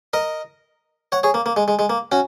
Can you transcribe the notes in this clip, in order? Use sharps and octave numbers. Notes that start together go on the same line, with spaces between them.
A#4 D#5
C#5 F#5
G#4 C#5
A#3
A#3
G#3
G#3
G#3
A#3
C#4 F#4